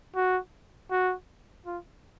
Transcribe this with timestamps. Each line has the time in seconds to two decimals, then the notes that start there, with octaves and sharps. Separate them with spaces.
0.15 F#4
0.91 F#4
1.66 F4